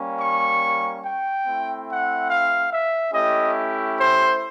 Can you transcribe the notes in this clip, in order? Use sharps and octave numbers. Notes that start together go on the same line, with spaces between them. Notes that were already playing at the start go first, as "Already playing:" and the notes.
Already playing: G3 A#3 C#4
C#6
G5
A3 C4 E4
F#5
F5
E5
A3 C#4 E4 G4 D#5
C5